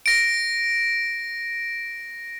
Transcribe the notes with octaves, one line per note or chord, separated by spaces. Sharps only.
A#6 D7